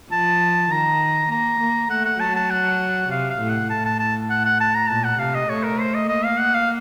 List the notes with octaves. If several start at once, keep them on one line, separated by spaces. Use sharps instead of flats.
F3 A5
D#3 A#5
A#3 A#5
A#3
A3 F#5
F#5
F#3 A5
A5
F#5
C3 F5
F5
A2
F#5
A2 A5
A5
A5
F#5
F#5
A5
A#5
A#2 A5
F#5
C3 F5
D#5
A3 C#5
A#4
C5
D#5
A#3 D#5
F5
F#5
F5